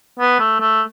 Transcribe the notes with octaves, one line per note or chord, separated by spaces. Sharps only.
B3
A3
A3